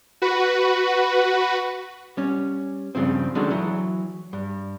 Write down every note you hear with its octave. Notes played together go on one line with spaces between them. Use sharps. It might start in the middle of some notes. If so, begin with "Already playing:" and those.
F#4 B4
G3 C#4
G2 A#2 C#3 F3 C4
D#3 F#3 G#3 A3 C#4 D4
E3 F#3
G2